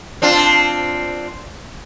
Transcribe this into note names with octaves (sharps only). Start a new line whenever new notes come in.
C4 D4 F4